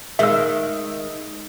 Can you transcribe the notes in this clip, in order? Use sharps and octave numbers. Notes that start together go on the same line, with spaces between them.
D#3 G#3 E5 E6